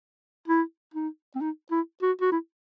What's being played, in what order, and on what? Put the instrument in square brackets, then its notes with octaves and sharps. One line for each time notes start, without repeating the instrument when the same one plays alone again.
[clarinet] E4
D#4
C4
D#4
E4
F#4
F#4
E4